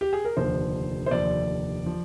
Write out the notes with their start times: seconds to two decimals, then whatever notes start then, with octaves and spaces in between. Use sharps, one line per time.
0.01 G4
0.13 G#4
0.25 A#4
0.37 F1 D#2 D3 F3 C5
1.06 C5
1.11 F1 D#2 D3 F3 D5
1.86 F3